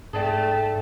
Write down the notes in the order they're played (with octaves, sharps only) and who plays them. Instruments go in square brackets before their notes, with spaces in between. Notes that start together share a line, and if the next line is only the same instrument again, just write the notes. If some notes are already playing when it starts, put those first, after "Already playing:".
[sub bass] G#2 [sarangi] A3 [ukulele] G#4 D5 G5 [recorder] A5